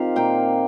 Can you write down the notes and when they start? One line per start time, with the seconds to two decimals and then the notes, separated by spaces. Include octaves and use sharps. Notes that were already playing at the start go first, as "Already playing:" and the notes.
Already playing: D#3 C4 F4 G4 F5
0.16 A#2 A#3 G5